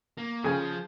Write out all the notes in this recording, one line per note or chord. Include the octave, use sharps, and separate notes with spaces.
A#3
C#3 F3 G#5